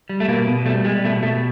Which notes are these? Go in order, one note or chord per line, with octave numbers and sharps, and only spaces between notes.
G3
A3
B2 A#3
B2
G3 A3
G3 G#3
B2 A3
B2 A3